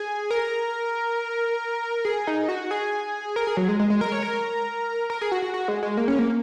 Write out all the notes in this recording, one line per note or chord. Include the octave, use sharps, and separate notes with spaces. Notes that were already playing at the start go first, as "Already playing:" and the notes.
Already playing: G#4
A#4
G#4
D#4
F#4
G#4
A#4
G#4
F#3
G#3
G#3
G#3
A#4
C#5
A#4
A#4
G#4
F#4
F#4
F#4
G#3
G#3
A#3
C#4
A#3